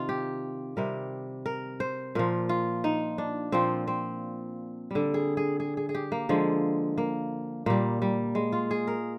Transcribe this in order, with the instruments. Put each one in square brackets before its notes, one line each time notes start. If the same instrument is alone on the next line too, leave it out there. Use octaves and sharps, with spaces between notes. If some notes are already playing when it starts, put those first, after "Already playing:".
Already playing: [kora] C3 D#3 D#4 F4
G4
C3 G3 A#4
A#4
C5
A#2 F3 A#4
F4
D#4
D4
A#2 F3 C4
C4
D3 G3
G#4
G#4
G#4
G#4
G#4
G4
A#3
D3 F3 G#3
A#3
A#2 G3 A#3
G3
G#3
F4
G#4
A#4